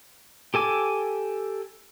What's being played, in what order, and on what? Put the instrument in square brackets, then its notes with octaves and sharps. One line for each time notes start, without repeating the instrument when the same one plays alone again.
[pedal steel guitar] G4 A4 G#5 D6 E6